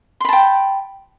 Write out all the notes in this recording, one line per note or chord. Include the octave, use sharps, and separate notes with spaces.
G5 A5 B5 C6